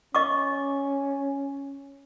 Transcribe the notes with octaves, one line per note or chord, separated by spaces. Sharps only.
C#4 D#5 C#6 D6